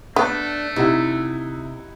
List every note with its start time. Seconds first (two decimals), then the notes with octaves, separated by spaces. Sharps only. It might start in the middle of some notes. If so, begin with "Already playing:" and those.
0.16 A3 B3 D4
0.76 C3 D#4 E4 F#5